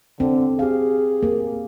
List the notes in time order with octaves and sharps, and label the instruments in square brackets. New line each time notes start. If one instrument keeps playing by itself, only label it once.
[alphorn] D3 [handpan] C4
[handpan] G4 F5 [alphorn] G#4
[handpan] A#3